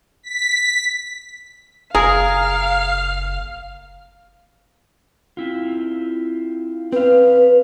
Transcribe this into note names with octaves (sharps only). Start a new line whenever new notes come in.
B6
F#1 G#4 A#4 F5
C4 E4 F4
C4 B4 F5